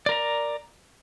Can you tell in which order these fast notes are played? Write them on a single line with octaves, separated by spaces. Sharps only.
D5 A#4 A#5